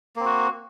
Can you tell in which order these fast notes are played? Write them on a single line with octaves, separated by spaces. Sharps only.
A#3 C4 F#4